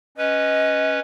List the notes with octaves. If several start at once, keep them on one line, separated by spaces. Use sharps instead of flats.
C#4 B4 D#5